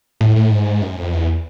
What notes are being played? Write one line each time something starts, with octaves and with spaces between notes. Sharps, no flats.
A2
A2
G#2
F#2
F2
E2